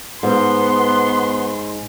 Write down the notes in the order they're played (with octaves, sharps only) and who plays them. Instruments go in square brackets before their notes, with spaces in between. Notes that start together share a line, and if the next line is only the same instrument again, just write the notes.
[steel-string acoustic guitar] G#2 [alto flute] B3 [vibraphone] C5 [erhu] C6